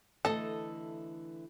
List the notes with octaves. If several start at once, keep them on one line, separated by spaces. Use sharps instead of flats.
D3 E3 A3 A4 D#5 A5